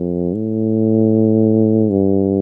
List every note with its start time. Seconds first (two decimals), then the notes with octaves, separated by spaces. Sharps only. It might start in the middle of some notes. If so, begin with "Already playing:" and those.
Already playing: F2
0.35 A2
1.91 G2